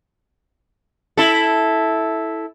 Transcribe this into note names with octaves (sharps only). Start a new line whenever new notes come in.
E4 A4